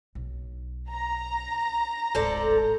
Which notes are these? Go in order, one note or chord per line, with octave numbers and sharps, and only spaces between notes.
B1
A#5
D1 G#1 A4 C5 D5